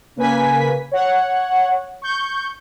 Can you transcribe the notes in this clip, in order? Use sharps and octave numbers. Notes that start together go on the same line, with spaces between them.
C#3 A#3 B4 G#5 B6
C#5 F#5
C#6 G6